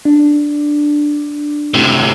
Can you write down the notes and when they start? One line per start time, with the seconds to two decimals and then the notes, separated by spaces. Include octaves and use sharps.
0.05 D4
1.74 A2 C3